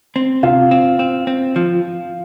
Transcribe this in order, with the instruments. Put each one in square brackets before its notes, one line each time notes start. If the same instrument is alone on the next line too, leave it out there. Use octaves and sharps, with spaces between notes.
[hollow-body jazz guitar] C4
[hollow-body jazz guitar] C3 [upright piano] F4
[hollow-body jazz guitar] C4
C4
C4
F3